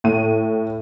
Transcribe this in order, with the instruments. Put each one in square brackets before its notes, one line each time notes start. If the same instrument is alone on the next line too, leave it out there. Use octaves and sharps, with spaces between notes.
[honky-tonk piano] A2 D#7